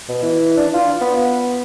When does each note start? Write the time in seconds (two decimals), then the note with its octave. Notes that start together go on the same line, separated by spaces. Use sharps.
0.09 B2
0.23 E3
0.57 D4
0.74 F4
1.01 B3